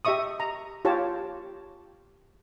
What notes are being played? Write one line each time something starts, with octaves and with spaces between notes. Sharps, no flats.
G4 D#5 E5 C#6 D#6
A#5
F4 G4 C#5 A5